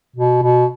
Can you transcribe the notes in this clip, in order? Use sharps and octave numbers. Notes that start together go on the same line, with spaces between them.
B2
B2